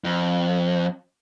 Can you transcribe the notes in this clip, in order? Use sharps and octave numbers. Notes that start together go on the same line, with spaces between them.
F2